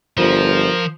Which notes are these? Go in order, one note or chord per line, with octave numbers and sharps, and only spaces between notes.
G1 F3 F4 A#4 C5